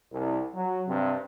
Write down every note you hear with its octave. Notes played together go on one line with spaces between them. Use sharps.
C2
F#3
G2 C3 C4